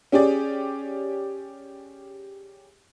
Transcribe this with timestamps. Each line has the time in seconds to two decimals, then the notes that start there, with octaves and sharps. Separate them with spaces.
0.12 C#4 G4 G#4 D5